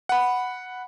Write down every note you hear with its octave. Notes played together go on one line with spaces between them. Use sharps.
F#5 B5